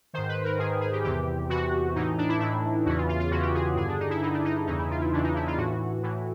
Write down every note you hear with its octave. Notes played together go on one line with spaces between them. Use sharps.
G#2 D#3 C5
B4
A#4
G#2 D#3 G#4
G#4
G4
E2 C3 E3 G4
E2 C3 E3 F#4
A2 E3 D#4
D4
E4
A2 E3 E4
E2 C#3 E3 F#4
F4
F4
F4
E2 C#3 E3 F#4
G4
G#4
G2 D3 G#4
D4
D#4
E4
G2 D3 D#4
D4
D#4
E2 C#3 E3 D#4
E4
F4
E4
E2 C#3 E3 D4
D#4
E4
F4
A2 E3 F#4
A2 E3